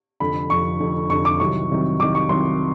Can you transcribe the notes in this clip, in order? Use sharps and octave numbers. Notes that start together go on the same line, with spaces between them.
F1 F2 D3 B5
F1 F2 D3 C#6
F1 F2 D3
F1 F2 D3 C#6
D6
C2 C3 D#3 F#3 C#6
C2 C3 D#3 F#3
C2 C3 D#3 F#3 D6
C#6
C2 C3 D#3 F#3 C6